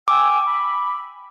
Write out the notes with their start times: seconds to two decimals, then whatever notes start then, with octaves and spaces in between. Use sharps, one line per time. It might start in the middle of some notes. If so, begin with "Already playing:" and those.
0.08 G5 G#5 D6 E6
0.45 B5